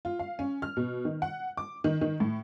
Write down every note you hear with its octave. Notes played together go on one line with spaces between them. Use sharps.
F4
F5
C#4
F6
B2
D#3
F#5
D6
D#3
D#3
A2